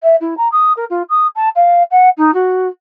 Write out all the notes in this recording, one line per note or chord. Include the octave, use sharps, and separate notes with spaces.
E5
E4
A#5
D#6
A#4
F4
D#6
A5
F5
F#5
D#4
F#4